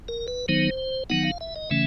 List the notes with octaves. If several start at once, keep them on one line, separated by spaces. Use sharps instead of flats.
A#4
B4
D#3 F#3 B3 D#4 C5
D#3 F#3 B3 D#4 F#5
F5
E5
D#5
C#3 E3 A3 C#4 E5